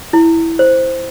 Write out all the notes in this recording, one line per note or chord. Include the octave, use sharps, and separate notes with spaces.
E4
C5